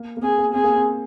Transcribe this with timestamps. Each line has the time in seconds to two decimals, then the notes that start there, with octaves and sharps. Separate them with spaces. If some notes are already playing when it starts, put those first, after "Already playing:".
Already playing: A#3
0.17 A#3
0.22 C4 G#4
0.38 A#3
0.54 C4 G#4
0.64 A#3
0.75 C4